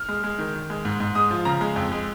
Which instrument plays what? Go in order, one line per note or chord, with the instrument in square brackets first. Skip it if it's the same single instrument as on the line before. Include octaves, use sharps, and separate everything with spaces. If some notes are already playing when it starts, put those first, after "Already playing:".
Already playing: [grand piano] F6
G#3
G#3
D#3
D#3
G#3
G#2
G#2
G#3 D#6
F3
C#3 A#5
G#3
F2
G#3